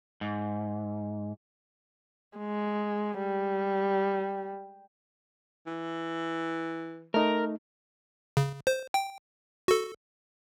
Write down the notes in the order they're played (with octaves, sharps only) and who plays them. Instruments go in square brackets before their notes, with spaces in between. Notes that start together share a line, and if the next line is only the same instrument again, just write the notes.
[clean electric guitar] G#2
[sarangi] G#3
G3
[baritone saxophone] E3
[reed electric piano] A3 D#4 [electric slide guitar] A#4
[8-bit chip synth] C#3
C5
G5
F#4 A4